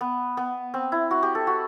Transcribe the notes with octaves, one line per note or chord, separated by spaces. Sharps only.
B3
B3
C4
E4
F#4
G4
A4
F#4